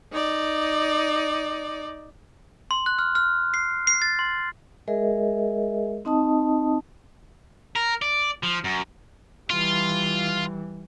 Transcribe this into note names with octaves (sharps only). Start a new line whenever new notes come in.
D#4 D5
C6
F#6
F6
F6
C7
C7
A6
C6
G#3 G#4 A#4 D#5 E5
C4 D#4 D#5 A5 D#6
A#4
D5
F3
F#2
E3 G3 F4